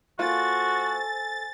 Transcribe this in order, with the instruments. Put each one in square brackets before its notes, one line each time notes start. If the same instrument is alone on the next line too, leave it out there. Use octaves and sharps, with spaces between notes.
[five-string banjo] A#3 F4 [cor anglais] F#4 [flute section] A4 C5 G#5 [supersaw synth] A6